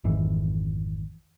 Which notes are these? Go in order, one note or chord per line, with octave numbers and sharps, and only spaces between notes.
G#1 F2 D#3 E3